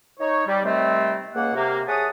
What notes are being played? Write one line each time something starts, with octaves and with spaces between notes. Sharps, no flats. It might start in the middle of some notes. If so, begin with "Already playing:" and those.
D#4 C#5
G3
C3 D#3 G3 A3 C4
C#2 A#3 F#5
C3 A#3
G#4 C#5 E5 F#5 A5 D#6